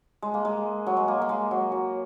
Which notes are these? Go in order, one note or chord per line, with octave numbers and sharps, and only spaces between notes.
G#3
A#3
G#3
F#3
G#3
A#3
A#3
G#3
F#3
F#3